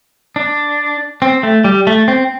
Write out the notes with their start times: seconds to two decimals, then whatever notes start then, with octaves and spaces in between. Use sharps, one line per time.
0.36 D4
1.22 C4
1.43 A3
1.64 G3
1.87 A3
2.08 C4